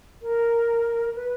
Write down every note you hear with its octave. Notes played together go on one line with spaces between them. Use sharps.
A#4
B4